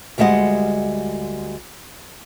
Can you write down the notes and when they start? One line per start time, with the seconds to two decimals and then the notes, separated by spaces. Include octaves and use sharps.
0.18 D2 G3 G#3 D#5 F#5